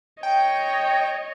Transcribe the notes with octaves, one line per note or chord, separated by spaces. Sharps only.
C#5 D#5 G5